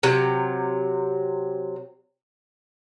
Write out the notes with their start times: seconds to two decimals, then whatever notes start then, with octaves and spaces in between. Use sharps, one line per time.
0.03 C3 F#3